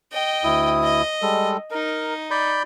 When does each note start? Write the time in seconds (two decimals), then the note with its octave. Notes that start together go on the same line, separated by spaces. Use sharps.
0.12 D#5 G5
0.44 D2 E4 D#6
0.83 D#5
1.22 G3 G#3 A4
1.71 D#4 A#4
2.31 D5 B5 G6